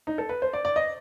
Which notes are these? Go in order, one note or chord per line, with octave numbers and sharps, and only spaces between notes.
D#4
A4
B4
C5
D5
D5
D#5